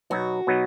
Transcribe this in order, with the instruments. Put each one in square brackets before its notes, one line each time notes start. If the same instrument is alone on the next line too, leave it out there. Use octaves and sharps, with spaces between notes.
[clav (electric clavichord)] B2 F#3 B3 D#4 [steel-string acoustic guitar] F#4
[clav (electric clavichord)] B2 F#3 B3 D#4